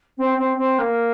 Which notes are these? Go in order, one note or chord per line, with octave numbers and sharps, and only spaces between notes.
C4
C4
C4
A#3